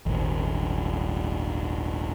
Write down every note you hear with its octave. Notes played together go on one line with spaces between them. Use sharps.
D#1 G#1